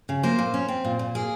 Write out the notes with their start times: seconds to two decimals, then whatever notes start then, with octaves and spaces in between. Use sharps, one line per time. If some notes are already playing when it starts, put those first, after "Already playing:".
0.09 C#3
0.23 A#3 C5
0.39 A#2
0.54 C#4
0.68 C4
0.85 A#2
0.99 A#2
1.15 A#3 G#4